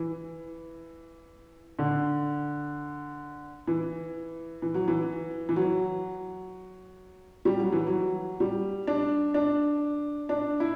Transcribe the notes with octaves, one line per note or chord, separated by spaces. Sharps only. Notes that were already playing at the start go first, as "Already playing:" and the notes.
Already playing: E3
D3
E3
E3
F#3
E3
E3
F#3
G3
F#3
E3
F#3
G3
D4
D4
D4
E4